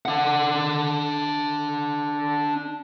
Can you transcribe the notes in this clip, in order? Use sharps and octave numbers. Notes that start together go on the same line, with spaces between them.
D4 F#5